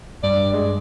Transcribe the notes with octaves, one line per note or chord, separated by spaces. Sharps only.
G2 D5
G#3